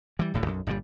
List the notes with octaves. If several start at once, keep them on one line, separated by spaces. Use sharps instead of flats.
E3 G3
D1 A2 D3
B1 F#2
G1 A#2 C#3 G3